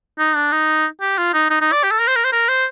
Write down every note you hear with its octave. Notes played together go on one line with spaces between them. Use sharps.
D#4
D4
D#4
G4
F4
D#4
D#4
D#4
D5
G4
A4
A#4
C5
A#4
C5
A#4
C5